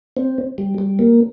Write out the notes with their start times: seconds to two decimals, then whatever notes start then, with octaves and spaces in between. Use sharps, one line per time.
0.17 C4
0.58 G3
0.78 G3
0.99 A#3